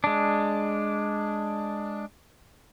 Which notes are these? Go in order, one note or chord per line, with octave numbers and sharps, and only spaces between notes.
G#3 D4